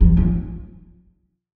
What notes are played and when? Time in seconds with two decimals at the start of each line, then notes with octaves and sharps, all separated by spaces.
0.01 F3
0.17 F3